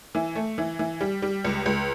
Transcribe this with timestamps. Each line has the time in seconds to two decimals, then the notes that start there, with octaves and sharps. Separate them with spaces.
0.15 E3
0.35 A3
0.58 E3
0.79 E3
1.01 G3
1.22 G3
1.45 C#2
1.66 C#2